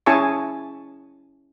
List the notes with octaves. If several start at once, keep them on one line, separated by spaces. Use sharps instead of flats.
C#4 E4 G#4 G#5 A5 C#6